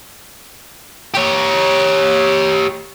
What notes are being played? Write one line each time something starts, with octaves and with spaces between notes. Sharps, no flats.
G4 C#5